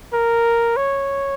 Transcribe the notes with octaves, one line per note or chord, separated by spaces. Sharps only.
A#4
C#5